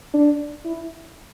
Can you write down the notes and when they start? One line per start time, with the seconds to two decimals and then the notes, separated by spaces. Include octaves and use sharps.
0.14 D4
0.65 E4